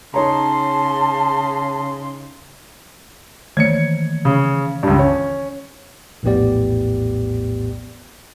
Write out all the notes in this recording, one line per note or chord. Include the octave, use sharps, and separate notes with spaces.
C#3 D#4 C#5 A5 A#5 C6
D#3 E3 G#6 C#7
C#3
C#2 G2
C#4
A#1 E2 A2 B3 G4 D5